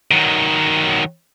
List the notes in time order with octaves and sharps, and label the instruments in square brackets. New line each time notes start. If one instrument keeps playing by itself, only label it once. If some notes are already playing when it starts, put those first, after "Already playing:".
[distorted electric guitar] D#3 F#3